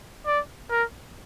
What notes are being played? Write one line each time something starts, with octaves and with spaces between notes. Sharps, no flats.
D5
A#4